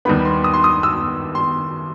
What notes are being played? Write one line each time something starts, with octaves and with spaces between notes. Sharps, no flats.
D#2 D#3 G3 B3 B5
C6
D#6
C6
D#6
E6
C6